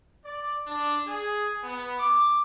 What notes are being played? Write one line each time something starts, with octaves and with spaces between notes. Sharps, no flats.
D5
D4
G#4
B3
D6